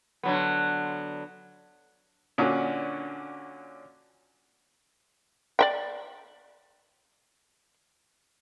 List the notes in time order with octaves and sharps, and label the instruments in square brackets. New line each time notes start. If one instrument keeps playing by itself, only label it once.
[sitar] D3 F#3 B3
[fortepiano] A#2 D3 C#4 D4 F#4
[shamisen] D5 E5 G5